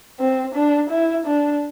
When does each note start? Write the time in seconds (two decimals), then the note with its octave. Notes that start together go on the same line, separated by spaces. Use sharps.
0.20 C4
0.54 D4
0.90 E4
1.26 D4